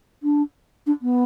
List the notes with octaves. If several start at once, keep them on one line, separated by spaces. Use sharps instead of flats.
D4
D4
B3